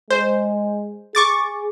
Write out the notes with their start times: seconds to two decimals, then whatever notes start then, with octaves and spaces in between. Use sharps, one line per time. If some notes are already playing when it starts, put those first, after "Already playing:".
0.10 G#3 C5
1.15 G#4 C#6 D6 A6